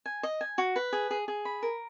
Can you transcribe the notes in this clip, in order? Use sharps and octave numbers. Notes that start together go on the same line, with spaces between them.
G#5
D#5
G#5
F#4
B4
G#4
G#4
G#4
B5
A#4